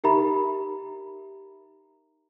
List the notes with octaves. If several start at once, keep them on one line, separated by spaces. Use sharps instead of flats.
D#4 G4 A#4 E5 A#5 B5